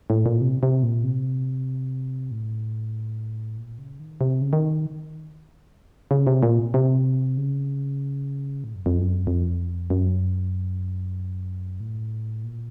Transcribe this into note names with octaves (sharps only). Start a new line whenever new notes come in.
A2
A#2
C3
C3
A#2
C3
A2
A#2
C#3
D#3
C3
C#3
D#3
C#3
C3
A#2
C3
C#3
A2
F#2
F2
F#2
F2
F#2
A2
A#2